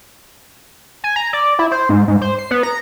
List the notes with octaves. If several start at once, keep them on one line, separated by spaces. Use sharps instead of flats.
G#5
A#5
D5
E4
C5
G#2
G#2
C5
C7
B3
A#5